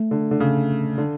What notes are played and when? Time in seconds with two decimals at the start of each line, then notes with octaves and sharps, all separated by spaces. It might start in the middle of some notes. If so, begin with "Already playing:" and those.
Already playing: A3
0.11 D3
0.31 D3
0.40 C#3
0.98 D3